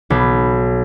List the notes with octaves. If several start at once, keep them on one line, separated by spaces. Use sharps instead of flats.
B1